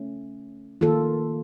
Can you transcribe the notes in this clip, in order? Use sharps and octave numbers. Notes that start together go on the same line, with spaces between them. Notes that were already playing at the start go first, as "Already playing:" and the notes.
Already playing: A3 C#4
D#3 A#3 F4 A4